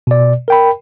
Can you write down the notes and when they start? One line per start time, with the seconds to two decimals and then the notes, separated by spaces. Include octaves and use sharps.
0.07 B2 D5
0.48 A#4 G5 B5